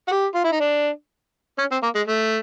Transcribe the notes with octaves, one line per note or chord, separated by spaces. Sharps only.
F#4
G4
F4
E4
D#4
D4
C#4
C4
A#3
G#3
A3